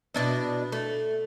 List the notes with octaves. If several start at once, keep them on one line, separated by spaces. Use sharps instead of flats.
B2 D4 E4
A3